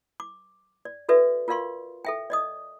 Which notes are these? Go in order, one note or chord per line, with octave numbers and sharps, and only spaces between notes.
D6
D5
F#4 A4 B4 D5 E5
F4 A#4 D5 F5 C6 C#6
A4 E5 G5
D5 D#5 D#6